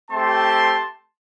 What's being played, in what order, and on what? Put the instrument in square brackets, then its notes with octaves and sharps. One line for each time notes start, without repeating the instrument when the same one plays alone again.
[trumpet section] A3 C4 G4 A5 C6